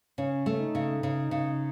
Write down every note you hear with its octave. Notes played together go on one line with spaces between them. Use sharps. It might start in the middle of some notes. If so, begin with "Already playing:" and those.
C#3 C#4
A3
D#4
C#3
C#3
C#3